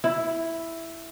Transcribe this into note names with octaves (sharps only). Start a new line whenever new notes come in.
E4